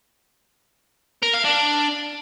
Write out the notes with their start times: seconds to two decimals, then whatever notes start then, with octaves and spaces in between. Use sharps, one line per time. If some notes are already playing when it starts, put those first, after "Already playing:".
1.22 A#4
1.33 F5
1.44 D4